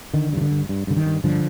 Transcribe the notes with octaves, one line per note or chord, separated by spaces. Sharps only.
D3 D#3
G2 D#3
D3
G2
G2
G2 D3
D#3
G2
G2 D3 F3